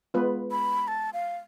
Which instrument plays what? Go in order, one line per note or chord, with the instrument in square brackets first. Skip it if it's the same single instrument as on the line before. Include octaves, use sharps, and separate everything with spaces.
[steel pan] G#3 B3 F4 B4
[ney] B5
A5
F5